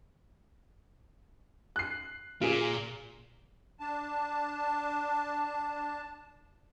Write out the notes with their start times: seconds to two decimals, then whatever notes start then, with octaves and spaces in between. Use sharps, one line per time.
1.76 F#6 C7
2.41 A#2 F4 G#4
3.80 D4 A5